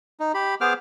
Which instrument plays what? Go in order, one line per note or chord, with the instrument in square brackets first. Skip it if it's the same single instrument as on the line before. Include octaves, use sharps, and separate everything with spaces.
[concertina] D#4
G4 B5
B3 G#4 C5 D6 F6